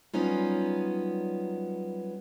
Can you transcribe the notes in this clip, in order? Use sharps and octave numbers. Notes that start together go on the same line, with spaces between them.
F#3 G3 B3 C#4 D#4 F4